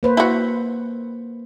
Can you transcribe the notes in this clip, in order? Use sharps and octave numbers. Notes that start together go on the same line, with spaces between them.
A#3 B4 C5
E4 F#4